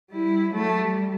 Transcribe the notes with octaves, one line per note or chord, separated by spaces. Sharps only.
G3 E4
F#3 A3
G3